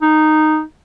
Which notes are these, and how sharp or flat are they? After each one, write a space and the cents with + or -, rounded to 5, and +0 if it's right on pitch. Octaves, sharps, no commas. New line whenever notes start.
D#4 -10